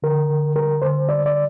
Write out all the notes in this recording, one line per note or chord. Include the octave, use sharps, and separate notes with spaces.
D3 A#4
D3
G3 A#4
D3 C5
G3 D5
D5